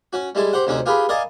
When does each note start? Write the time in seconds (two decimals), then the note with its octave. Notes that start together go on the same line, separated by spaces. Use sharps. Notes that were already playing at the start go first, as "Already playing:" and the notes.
0.13 C#4 F#4
0.35 G3 G#3 E4 A4
0.53 G4 C5 F#5
0.67 D2 C3 C#4 D#4 F#4
0.86 F4 G4 G#4 A#4 B4
1.09 A#4 D5 D#5 F5 G#5 A5